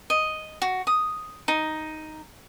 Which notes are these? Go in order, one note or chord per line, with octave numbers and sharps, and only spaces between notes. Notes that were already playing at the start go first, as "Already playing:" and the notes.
D#5
F#4
D#6
D#4